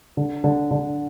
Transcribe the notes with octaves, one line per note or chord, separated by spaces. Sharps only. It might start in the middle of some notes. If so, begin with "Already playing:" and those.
D3
D3
D3